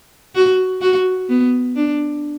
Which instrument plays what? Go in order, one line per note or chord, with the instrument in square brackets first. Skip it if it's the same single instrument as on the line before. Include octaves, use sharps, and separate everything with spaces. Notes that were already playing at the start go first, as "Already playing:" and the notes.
[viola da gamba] F#4
F#4
B3
D4